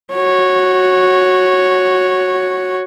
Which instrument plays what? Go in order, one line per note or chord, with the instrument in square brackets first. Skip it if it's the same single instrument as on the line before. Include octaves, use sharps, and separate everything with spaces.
[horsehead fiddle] F#4 C#5